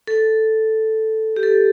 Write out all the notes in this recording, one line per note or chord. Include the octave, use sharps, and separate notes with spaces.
A4
G4
A4